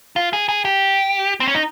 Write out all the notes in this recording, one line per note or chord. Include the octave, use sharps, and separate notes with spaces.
F4
G#4
G#4
G4
C4
C#4
D#4